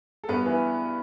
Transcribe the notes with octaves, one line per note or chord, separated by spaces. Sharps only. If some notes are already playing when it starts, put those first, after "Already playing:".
A4
G2 B3 B4
E3